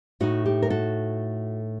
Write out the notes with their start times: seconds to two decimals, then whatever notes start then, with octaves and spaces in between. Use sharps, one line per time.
0.20 A2 A3 D#4 F#4
0.46 G4
0.62 A#4
0.70 F#4 A4